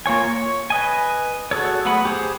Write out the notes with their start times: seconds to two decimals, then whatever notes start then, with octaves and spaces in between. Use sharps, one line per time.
0.06 A#3 F4 C#5 G#5
0.30 C#5
0.70 B4 D#5 G#5
1.51 F#4 G#4 A4 C#5
1.85 F#3 A3 B3 F#5 B5
2.05 G4 G#4 C5